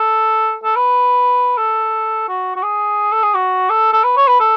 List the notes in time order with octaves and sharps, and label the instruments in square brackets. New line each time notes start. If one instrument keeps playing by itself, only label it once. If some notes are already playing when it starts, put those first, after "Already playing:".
Already playing: [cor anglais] A4
A4
B4
A4
F#4
F#4
G#4
A4
G#4
F#4
A4
A4
B4
C#5
B4
A4